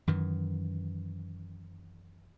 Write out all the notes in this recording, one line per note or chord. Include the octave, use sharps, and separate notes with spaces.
F#2 D#3 E3